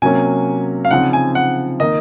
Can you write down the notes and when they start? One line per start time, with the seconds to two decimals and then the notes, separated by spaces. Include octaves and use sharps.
0.02 C3 F#3 A#3 C#4 G#5
0.85 F5
0.91 C#3 F3 C4 D#4 F#5
1.13 G#5
1.35 F#5
1.80 D#3 A#3 D#4 D#5